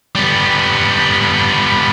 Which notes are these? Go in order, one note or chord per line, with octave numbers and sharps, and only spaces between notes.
G3 B3